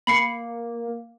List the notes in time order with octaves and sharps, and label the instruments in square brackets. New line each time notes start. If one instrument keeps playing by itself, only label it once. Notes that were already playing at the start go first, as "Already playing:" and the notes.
[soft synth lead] A#3 [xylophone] B5 C7 C#7